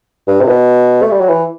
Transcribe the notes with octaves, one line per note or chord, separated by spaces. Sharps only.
G2
C3
B2
A3
G3
F#3
E3